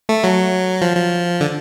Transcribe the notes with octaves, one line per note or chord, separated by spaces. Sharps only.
A3
F#3
F3
F3
D3